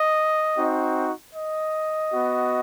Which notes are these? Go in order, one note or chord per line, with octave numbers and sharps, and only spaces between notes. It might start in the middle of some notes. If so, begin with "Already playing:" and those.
Already playing: D#5
C4 D#4 F#4
D#5
B3 F#4